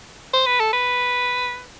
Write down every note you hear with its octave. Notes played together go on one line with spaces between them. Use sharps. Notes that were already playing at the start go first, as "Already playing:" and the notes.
C5
B4
A4
B4